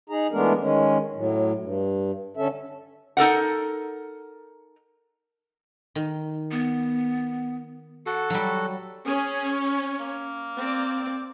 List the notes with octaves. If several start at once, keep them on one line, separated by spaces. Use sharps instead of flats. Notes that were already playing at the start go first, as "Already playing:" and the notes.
D#4 G#4 A#5
E3 G#3 A3 B3 D4 A#4
D#3 G#3 C#4
A2 F#3
G2
D3 C#4 A4 E5
D#4 A4 A#4 F#5
D#3
B3
F#4 A4 F#5
F#3 G3
C#4 G#4
C#5
A#3
C4 D5